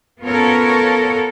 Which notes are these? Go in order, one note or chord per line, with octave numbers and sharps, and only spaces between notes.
B3 C#4 F4 A4 A#4 C#5